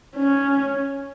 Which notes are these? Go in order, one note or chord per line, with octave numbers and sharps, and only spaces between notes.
C#4